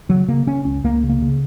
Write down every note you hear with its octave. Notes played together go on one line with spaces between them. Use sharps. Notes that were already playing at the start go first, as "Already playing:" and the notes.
C#3 F#3
C#3 A#3
C#3 C#4
C#2 C#4
C#2 A#3
C#3
A#3
C#3